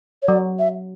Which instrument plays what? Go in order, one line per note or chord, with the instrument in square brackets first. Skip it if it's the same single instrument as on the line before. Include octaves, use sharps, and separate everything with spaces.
[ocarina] C#5
[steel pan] F#3 [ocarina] D5
[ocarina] E5